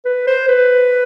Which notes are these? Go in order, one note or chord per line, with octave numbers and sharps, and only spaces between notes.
B4
C5
B4